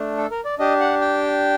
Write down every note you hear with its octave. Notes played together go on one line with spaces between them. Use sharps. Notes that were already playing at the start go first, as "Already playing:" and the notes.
Already playing: A3 D4
A4
A#4
D5
D4 G4 D#5
F#5
G5